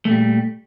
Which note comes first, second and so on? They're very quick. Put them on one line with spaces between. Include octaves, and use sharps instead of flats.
A3 A#2 G3